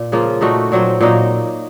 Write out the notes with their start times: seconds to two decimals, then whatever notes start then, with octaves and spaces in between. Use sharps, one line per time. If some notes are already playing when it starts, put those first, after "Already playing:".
Already playing: A#2
0.12 C#3 F3 A#3 F4
0.41 A#2 A3 D#4 F#4
0.72 A#2 F#3 C4
1.01 A#2 F#3 A#3 D#4